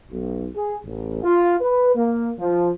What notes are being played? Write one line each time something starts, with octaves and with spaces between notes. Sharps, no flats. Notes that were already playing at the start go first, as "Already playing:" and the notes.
B1
G#4
A1
F4
B4
A#3
F3